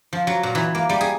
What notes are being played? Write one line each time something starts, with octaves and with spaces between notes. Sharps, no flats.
F3
F#3
A#2
E3
A#3
G3
G#4